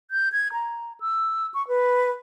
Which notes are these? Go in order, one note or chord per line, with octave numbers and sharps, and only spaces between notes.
G6
G#6
A#5
E6
C#6
B4